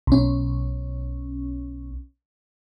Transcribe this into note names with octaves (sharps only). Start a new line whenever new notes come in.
B1 C#4